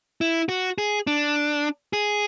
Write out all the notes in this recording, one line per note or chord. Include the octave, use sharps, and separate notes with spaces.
E4
F#4
G#4
D4
G#4